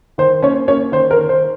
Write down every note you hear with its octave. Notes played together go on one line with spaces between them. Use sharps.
D#3 C5
A#3 C#4 C#5
A#3 C#4 C#5
D#3 C5
A#4
D#3
C5